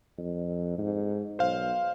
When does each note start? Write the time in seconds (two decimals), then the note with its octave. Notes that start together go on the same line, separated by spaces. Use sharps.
0.18 F2
0.78 G#2
1.39 B1 C5 F5